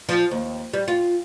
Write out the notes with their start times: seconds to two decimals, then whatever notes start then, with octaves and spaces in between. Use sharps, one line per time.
0.09 F3
0.31 D#2
0.73 G3
0.88 F4